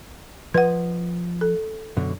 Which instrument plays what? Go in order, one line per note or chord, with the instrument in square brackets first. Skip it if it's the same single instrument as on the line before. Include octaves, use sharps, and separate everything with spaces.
[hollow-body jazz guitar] F3 D#5 [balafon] B4 F#5
[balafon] A4
[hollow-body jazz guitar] F#2 B2 D3